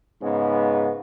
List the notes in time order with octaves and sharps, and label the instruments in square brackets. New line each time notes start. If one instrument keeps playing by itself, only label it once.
[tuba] G#2 [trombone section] C#3 G#3 B3